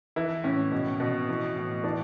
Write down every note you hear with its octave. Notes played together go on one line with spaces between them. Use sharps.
E3 E4
A2 C#4
B2
B2
E3
A2
E3 D4